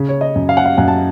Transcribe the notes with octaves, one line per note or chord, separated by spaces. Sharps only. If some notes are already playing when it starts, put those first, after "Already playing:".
Already playing: C#3
C#5
D#5
F#2
F5
F#5
F5
F#2 F#5
A5